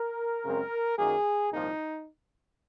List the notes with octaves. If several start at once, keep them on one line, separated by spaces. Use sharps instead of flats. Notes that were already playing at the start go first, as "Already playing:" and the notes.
Already playing: A#4
F#2 C#3 G#3 C4
F#2 D#3 F#3 A#3 G#4
C2 A#2 F3 D#4